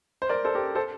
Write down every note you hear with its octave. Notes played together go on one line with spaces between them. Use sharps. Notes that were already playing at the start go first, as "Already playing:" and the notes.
C5
A#4 D5
A4 C5
G4 A#4
A4 C5